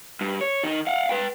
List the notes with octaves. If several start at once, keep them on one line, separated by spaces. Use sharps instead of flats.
G2
C#5
D#3 D#4
F5 F#5
B4 G5